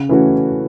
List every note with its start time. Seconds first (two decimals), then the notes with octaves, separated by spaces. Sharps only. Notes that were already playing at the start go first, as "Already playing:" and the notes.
Already playing: C#3
0.09 E3 A3 C#4 F#4